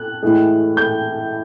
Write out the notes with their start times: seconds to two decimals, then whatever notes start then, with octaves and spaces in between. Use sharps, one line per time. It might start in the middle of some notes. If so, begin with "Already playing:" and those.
Already playing: F#6
0.23 A2 E3 G#3
0.77 G6